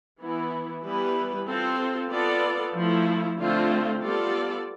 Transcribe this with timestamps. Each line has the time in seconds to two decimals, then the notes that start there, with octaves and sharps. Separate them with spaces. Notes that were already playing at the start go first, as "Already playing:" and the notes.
0.20 E3 B3 E4
0.83 E3 G3 B3 E4 B4
1.47 C4 F4 A4
2.10 B3 F4 A4 D5
2.75 F3 A3 E4
3.39 D3 A3 C4 F4
4.02 G3 B3 F4 A4 D5